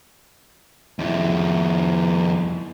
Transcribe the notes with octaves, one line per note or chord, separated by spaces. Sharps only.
F2 E4